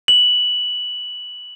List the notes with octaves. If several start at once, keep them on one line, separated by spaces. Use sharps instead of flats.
F#7